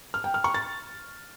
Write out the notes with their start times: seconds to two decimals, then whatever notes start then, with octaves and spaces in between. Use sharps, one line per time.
0.14 F6
0.24 G5
0.34 F6
0.44 C#6
0.54 A6